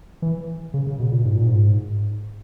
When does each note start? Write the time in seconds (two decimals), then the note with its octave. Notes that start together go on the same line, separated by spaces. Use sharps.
0.22 E3
0.74 C#3
0.87 C#3
0.99 B2
1.12 A#2
1.25 G#2
1.36 A#2
1.47 G#2